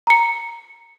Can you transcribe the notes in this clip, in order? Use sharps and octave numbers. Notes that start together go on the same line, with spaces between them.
A#5 C#7